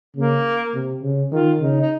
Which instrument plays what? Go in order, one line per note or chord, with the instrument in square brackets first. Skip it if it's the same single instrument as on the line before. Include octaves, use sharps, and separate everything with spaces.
[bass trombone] C#3 [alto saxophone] A#3
[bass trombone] C3
C#3
[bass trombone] D#3 [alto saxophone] F4
[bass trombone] C#3 [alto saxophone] D#4
[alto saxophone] D#4